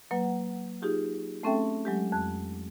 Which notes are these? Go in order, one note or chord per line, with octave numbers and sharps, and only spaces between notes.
F#3 A#3 B4 F#5
D#4 F4 G4 G#4
A3 C4 C#4 A4 E5 G5
F#3 G#3 G4
F2 F#6